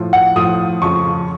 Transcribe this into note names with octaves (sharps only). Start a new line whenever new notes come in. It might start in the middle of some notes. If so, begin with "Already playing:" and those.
Already playing: A2 F3
F#5
A2 F3 D#6
F2 C#3 F3 C#6